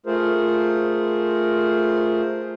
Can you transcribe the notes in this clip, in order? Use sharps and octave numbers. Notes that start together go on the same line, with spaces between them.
A3 F4 G#4 A#4 C5